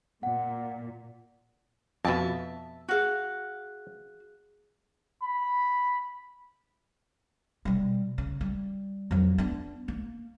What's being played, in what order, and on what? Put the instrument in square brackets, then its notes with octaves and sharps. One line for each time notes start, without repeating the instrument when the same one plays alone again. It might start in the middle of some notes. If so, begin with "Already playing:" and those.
[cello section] A#2 [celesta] F#5
[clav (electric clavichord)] F2 B2 [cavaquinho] E5 A5
[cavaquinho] F#4 F5 [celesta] G#4 F#6
[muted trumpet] B5
[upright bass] B2 G3
C#3
G3
F2 F#3
B3 D4
A#3